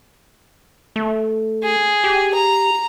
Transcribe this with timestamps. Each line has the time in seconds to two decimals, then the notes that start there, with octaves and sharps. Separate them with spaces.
0.96 A3
1.63 G#4
2.04 G4
2.34 A#5